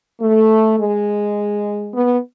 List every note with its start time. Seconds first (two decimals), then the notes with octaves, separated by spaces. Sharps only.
0.21 A3
0.79 G#3
1.93 B3